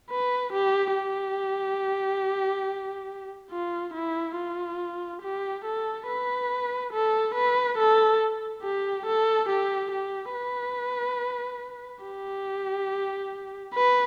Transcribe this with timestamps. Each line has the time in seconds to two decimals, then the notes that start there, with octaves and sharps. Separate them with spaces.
0.10 B4
0.53 G4
0.96 G4
3.51 F4
3.94 E4
4.37 F4
5.22 G4
5.65 A4
6.07 B4
6.93 A4
7.35 B4
7.78 A4
8.63 G4
9.07 A4
9.49 G4
9.92 G4
10.34 B4
12.04 G4
13.75 B4